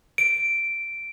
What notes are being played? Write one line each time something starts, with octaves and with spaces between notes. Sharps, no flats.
D7